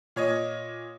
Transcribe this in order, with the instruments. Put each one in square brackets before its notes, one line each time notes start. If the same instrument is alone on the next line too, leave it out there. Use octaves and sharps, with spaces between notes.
[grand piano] A#2 C#5 D#5